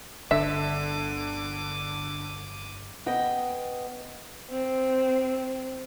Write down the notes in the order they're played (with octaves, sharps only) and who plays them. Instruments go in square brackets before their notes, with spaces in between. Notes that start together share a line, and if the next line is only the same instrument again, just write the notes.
[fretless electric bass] G1 D4 [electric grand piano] D3 [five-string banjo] E5 [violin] D6 D#7
[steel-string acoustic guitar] B3 D#5 G5
[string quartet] C4